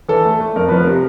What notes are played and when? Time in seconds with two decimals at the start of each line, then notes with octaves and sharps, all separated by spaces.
0.09 E3 A4
0.25 A3
0.40 A3
0.56 F2 A#4
0.69 F3 B4
0.82 A#4
0.87 C3